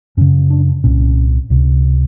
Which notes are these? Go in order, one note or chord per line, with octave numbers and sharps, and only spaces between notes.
F#2 C#3 C#4
D4
C2 A#2 C#4
C#2 C3